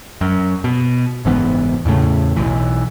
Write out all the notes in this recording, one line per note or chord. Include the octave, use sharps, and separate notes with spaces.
F#2
B2
F#1 G#2 E3 B3
E2 A2 C#3 A3
B1 E3